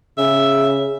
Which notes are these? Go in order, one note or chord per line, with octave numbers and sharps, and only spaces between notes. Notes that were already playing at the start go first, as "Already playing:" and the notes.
C#3 E5